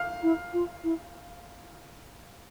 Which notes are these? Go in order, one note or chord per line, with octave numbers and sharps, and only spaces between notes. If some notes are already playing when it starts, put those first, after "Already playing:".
Already playing: F5 F6
E4
F4
E4